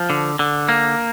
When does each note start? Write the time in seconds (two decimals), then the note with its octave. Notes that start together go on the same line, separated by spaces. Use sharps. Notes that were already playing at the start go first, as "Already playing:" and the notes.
Already playing: F3
0.10 D3
0.39 D3
0.69 A#3